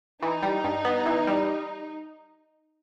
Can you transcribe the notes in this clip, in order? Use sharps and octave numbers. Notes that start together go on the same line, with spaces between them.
E3 D#4
G3
G2
B3
E3
G3